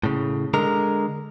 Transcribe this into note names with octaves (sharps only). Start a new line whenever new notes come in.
A2 C#3
D3 G#3 A#4